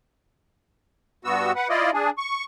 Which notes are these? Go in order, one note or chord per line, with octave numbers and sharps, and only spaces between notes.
G2 B3 F#4 E6
B4 F#5
E4 F4 D5 D#5
D4 G#4
C#6